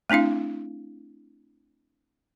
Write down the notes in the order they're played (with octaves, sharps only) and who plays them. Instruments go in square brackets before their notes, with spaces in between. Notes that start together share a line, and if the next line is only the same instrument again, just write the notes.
[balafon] A3 C4 D4 E4 F5